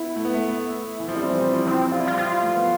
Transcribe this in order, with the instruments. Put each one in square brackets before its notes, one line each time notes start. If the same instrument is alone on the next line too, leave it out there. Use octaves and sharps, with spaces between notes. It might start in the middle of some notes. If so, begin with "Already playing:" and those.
Already playing: [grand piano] B3 [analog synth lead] E4
[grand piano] A3
B3
A3
E3
F3
[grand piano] G3 [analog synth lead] C4
[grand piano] E3
E3
F3
[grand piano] F3 [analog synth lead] C4
[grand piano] F3
[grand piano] G3 [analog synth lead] F4
[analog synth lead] E4
F4
[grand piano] F3 [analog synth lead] F4
[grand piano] A3
B3